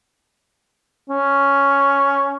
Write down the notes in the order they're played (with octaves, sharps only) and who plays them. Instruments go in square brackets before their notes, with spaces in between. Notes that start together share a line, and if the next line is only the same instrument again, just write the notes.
[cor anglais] C#4